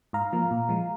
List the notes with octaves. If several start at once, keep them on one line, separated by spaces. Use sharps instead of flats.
G#2 F5 A#5
F3 A#3
A#2
F3 G#3